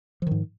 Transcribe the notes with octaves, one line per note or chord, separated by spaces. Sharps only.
G#2 D#3 F3